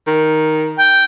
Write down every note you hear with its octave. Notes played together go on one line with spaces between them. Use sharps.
D#3
G5